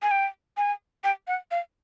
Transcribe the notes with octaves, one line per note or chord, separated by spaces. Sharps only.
G#5
G5
G#5
G5
F#5
F5